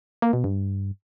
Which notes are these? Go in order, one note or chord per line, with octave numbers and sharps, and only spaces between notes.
A#3
B2
G2